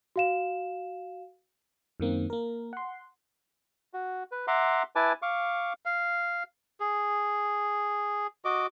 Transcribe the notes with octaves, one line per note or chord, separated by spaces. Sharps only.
F#4 F5 E7
F#2 D#3 A#3 C4
A#3 A#4
F#5 C6
F#4
B4
E5 F#5 A#5 C6 D6
E4 B4 G#5 A5 D6
F5 C#6 D6
F5
G#4
F#4 D#5 D6